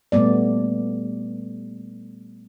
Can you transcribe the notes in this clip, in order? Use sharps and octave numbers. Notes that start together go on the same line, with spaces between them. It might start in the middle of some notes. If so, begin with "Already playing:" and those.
A#2 G3 A3 B3 D5